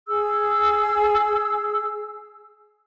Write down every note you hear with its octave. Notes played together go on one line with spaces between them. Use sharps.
G#4 E6